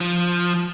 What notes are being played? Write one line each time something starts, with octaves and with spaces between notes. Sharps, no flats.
F3